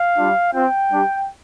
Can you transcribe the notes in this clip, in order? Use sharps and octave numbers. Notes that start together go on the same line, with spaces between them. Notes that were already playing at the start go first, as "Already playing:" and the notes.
Already playing: F5
G3 D4 F4
C4 F4 G5
G3 D4 G4